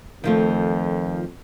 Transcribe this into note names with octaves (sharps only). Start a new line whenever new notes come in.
F2 D#3 F3 A3